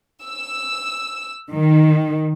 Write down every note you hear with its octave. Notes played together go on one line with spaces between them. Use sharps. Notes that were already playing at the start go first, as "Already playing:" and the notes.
E6
D#3